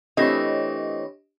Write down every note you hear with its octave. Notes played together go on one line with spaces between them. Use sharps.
E3 A3 C4 D4 G4 C#5 D#5 A#6